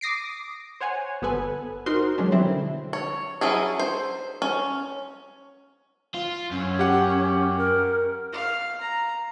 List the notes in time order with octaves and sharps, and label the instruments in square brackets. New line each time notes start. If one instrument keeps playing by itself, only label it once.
[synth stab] D6 D#6 A#6 C7 D7
C5 C#5 F#5 G#5
G1 B3 A4 B4 G#5
D#4 F#4 A#4 C5 C6
F#3 G#3 C#4 D4
B2 D3 F#3 G3 C4 E4
[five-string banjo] C#5
F#3 C#4 E4 G#4
C5
C#4
[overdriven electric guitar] F4
[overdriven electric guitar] F#2 [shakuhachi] C#4
[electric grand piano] G4 F#5
[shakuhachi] A#4
[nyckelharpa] F5
A#5